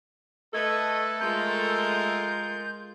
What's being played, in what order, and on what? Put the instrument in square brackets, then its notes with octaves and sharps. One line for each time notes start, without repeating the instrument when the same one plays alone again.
[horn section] A3 A4 [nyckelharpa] B4 [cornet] D#5 [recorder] G#6
[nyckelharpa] G#3 F4 [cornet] A#4 [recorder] G6